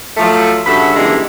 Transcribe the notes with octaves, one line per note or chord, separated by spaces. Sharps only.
F3 F#3 A3
G2 C#3 F#4 A4 E5 B5
F#2 A#2 D3 E3 G3 G#3